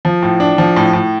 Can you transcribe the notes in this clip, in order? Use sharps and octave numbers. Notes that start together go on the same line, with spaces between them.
F3
A2
D4
F3
A2
A2